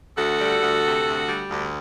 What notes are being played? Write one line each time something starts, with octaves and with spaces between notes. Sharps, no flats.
D2 F#4 A4
G3
D2
C3
D2
G3
D2